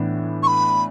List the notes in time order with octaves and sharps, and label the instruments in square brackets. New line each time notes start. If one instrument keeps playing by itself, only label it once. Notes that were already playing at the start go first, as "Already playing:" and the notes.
Already playing: [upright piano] A2 E3 B3 D4
[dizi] C#6
B5